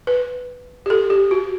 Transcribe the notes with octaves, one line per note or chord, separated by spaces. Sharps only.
B4
G4
A4
G4
F#4